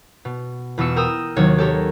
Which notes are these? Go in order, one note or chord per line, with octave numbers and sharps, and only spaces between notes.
B2
E2 B2 F4 E6 C#7
A#4 G5 D#6 E6
D#2 C3 D#3 F#3 C#5
G4 A4 A#4 C#5